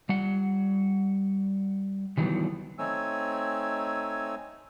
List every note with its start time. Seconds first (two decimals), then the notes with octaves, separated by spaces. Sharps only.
0.09 G3 F#5
2.18 D#3 E3 F#3 G3 B3
2.79 A3 C4 D#4 C#5 G#5 E6